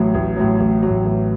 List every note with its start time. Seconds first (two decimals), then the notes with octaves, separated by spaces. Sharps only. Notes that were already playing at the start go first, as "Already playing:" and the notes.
Already playing: A1 A2 F#3
0.14 A1
0.37 A2 F#3
0.60 A1
0.82 A2 F#3
1.05 A1